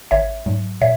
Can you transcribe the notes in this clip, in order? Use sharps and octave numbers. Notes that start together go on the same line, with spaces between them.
G#1 C#5 E5
G#2 F#3
A#2 C#5 E5